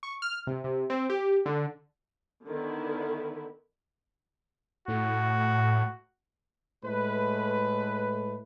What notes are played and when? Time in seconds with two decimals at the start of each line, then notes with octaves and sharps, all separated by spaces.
0.03 C#6
0.22 F6
0.47 C3
0.64 C3
0.90 C4
1.10 G4
1.46 D3
2.46 D3 D#3 B3 E4
4.88 A2 F#4
6.84 A2 G#3 A3 B4